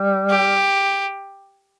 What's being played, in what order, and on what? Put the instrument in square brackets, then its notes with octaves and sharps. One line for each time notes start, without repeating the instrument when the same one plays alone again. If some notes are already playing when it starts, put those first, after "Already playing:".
Already playing: [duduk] G3
[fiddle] G4